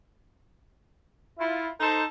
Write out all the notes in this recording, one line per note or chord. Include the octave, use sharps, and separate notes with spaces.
E4 F4
D#4 A4 C5